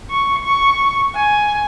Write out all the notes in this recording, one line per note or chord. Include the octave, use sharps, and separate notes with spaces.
C#6
C#6
G#5